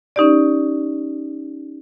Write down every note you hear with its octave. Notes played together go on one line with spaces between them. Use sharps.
C#4 D#4 G4 D5